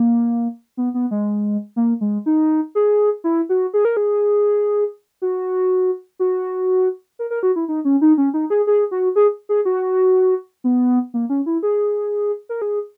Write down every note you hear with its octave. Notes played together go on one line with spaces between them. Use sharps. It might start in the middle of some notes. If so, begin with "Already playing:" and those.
Already playing: A#3
B3
B3
G#3
A#3
G#3
D#4
G#4
E4
F#4
G#4
A#4
G#4
F#4
F#4
A#4
A#4
F#4
E4
D#4
C#4
D#4
C#4
D#4
G#4
G#4
F#4
G#4
G#4
F#4
B3
A#3
C#4
E4
G#4
A#4
G#4